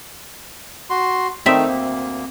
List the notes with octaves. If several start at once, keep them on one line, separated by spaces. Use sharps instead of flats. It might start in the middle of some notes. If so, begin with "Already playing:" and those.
F#4 C6
D#3 A3 C4 D#4 E5
D2 A#3